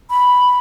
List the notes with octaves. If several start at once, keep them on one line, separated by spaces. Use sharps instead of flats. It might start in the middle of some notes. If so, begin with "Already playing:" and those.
B5